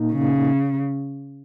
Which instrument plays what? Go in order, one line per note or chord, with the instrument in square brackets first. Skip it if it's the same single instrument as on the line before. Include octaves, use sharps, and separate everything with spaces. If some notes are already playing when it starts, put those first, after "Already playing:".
Already playing: [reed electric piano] A#2 A#3 D#4
[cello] C#3